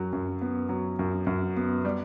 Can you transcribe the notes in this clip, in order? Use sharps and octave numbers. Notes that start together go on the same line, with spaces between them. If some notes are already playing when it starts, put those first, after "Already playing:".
Already playing: F#2 F#3
F#2
B3
F#3
F#2
F#2
B3
G3